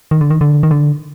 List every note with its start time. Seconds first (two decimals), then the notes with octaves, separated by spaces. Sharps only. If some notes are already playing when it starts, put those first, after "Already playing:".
0.11 D#3
0.21 D3
0.30 D#3
0.41 D3
0.63 D#3
0.71 D3